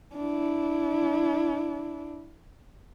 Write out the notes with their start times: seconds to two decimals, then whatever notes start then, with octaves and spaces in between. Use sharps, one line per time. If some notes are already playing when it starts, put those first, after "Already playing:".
0.16 D4 E4